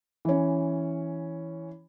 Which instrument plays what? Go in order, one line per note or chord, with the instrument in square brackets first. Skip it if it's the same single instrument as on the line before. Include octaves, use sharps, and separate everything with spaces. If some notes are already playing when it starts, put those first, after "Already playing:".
[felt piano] E3 C#4